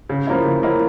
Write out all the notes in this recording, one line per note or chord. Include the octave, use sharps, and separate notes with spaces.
C#3
F3 A#3 C#4 E4
C#3
F3 A#3 C#4 E4